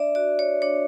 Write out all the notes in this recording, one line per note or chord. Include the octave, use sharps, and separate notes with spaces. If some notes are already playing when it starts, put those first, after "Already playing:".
Already playing: D4 D5 E5
F#4 D5
C#5
D4 C#5